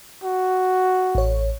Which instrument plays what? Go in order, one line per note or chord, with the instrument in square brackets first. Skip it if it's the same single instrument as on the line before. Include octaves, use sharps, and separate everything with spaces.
[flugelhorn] F#4
[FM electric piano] A1 C#5